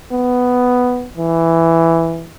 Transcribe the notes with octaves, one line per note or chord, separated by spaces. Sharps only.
B3
E3